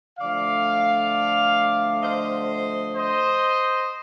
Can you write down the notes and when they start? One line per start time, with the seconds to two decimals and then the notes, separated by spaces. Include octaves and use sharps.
0.19 D3 F3 A3 D5 F5
2.03 C5 D#5
2.96 C5 D#5